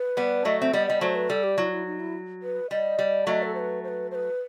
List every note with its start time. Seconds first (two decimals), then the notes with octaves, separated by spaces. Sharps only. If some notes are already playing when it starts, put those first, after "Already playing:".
Already playing: B4
0.17 G3 B3
0.45 F#3 A3 D#5
0.60 C4 E5
0.73 G3 B3 D#5
0.87 G3 D#5
1.01 F#3 A3 C5
1.15 B4
1.29 G3 A4
1.43 G4
1.58 F#3 E4
1.72 E4
1.86 D#4
2.00 E4
2.42 B4
2.71 G3 D#5
2.99 G3
3.27 F#3 A3 D#5
3.43 A4
3.54 C5
3.59 B4
3.84 C5
3.88 B4
4.11 C5
4.15 B4